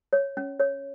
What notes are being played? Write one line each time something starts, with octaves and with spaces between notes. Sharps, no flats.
C#5
C#4
C#5